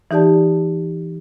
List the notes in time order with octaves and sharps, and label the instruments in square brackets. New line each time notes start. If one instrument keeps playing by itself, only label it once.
[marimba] E3 D#4 G4 D5 A5